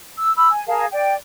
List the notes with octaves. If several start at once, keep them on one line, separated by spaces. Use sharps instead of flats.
E6
B5 E6
G#5
G#4 A#4 F5 A5
D5 G5